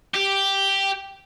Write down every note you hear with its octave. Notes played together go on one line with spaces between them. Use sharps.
G4